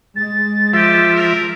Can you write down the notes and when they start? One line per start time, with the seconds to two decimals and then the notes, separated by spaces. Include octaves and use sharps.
0.16 G#3 A6
0.73 F3 G4 E5
1.14 A#4